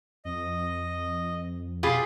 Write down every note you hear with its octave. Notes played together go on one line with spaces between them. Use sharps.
F2 D#5
B2 F4 G4 G#4 B5